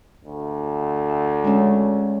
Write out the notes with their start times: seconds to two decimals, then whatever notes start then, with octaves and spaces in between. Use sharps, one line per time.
0.24 D2
1.44 G#3 C#4